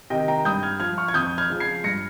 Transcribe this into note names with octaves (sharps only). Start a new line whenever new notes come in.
C3 D#3 D#5 G5
G5 A#5
G2 D#6 G6
F6 G#6
F3 F6 G#6
C#6 F6
G#6
F2 D#6 G6
F6 G#6
C#3 F3
G#6 C7
G2 A#6 C#7